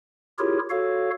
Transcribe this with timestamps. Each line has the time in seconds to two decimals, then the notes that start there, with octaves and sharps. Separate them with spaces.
0.39 E4 F4 G4 G#4 A#4 C#5
0.70 F#4 A4 C#5 F5